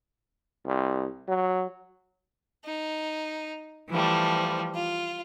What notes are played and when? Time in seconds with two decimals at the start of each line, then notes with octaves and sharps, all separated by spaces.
0.66 C2
1.28 F#3
2.64 D#4
3.89 E3 F3 G3 A3
4.74 F4